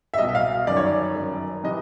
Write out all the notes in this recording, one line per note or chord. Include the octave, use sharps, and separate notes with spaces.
E5
C2 B2 D#5
E5
F5
G1 F#2 D#3 D5
C#5
D5
G1 F#2 D#3
C3 E3 D#5